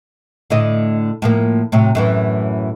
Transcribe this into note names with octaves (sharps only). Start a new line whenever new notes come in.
A2 D3 D#5
A2 F3 A#3
A2 C3 F#3
F#2 A2 E3